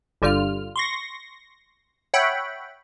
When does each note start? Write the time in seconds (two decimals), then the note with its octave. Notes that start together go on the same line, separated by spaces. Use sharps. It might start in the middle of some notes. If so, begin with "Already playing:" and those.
0.22 G1 D3 G3 F4 F6
0.76 C6 C#6 A#6
2.14 C#5 E5 F#5 G5 B5